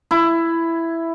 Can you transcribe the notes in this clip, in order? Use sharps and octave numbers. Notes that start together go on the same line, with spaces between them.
E4